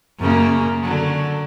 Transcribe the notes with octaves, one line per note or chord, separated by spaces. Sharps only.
F#2 C#3 A#3
D3 F#3